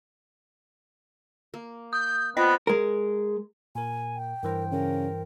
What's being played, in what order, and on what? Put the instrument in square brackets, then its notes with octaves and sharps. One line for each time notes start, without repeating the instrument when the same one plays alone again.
[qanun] A#3
[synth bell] D#6 [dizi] G6
[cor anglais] B3 [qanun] C4 F4 D5 [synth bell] D#5 A#6 [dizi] B5
[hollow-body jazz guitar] G#3 A#4
[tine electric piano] A#2 A#4 [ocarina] G#5
[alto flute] G5
[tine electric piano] G2 E3 C5 [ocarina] A#4
[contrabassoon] C#3 [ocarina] A#4